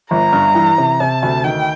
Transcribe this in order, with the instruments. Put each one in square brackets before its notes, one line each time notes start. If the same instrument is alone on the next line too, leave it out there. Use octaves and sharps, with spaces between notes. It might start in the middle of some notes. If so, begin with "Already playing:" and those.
[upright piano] G1 [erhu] A#5
[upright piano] G2
E3
C3
[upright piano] C3 [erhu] A5
[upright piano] D2
[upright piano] D#3 [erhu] G5